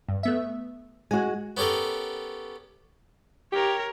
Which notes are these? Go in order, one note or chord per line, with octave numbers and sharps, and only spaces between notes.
G2
A3 B3 E5
G#3 F#4 G#5
B3 C#4 G4 A4 A#4
G4 A#4 C#5